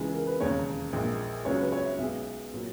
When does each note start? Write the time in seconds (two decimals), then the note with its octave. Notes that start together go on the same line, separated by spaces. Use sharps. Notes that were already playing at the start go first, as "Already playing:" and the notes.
Already playing: C#2 C#3 E3 G#3
0.13 A#4
0.27 B4
0.40 E1 D#2 C#3 C#5
0.93 A#1 A#2 G#3
1.45 C#2 C#3 F#3 C#5
1.59 B4
1.72 C#5
1.85 E5
1.98 B1 B2 G#3 E5
2.53 A#2 F#3